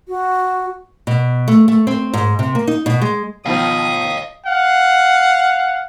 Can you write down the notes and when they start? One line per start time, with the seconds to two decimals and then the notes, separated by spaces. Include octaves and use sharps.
0.08 F#4
1.07 B2
1.48 A3
1.68 A3
1.87 C4
2.14 G#2
2.39 C3
2.55 A#3
2.67 D#4
2.86 B2
3.01 G#3
3.46 B2 D#3 F3 D#5 F5 D#6
4.47 F5 F#5